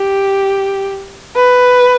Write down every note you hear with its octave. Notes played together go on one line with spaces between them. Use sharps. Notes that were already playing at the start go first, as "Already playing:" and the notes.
Already playing: G4
B4